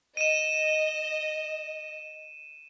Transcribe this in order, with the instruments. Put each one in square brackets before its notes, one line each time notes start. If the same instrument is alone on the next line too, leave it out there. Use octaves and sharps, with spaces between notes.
[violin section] D#5 [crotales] D#7 E7